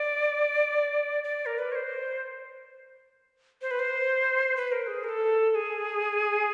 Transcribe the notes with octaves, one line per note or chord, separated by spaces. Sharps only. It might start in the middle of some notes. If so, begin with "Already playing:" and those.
Already playing: D5
D5
A#4
B4
C#5
C5
C5
B4
C5
B4
A#4
G#4
A#4
A4
A4
G#4